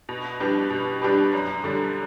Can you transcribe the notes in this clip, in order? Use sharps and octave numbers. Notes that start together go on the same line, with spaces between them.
B2
G3 D4 G4 B4
B2
G3 D4 G4 B4
F#2
D3 G3